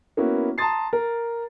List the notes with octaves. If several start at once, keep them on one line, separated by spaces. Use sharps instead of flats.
A#3 B3 C#4 E4 F#4
A5 A#5 C6 D#6 A6 C7
A#4